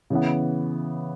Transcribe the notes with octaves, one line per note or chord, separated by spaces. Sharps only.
C#3 E3 B3